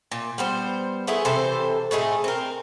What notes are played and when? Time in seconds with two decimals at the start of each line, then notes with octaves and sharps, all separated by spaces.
0.12 A#2
0.38 G3 B3 C5
1.07 A3 B3 E4 G#4
1.25 C3 E3 A4 C5
1.91 A2 A3 D#4 G#4
2.24 C4 A#4